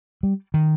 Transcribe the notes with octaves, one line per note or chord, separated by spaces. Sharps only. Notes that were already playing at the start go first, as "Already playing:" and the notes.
G3
D#3